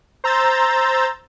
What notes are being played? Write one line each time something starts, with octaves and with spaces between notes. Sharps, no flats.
C5 A#5 E6 G6 A6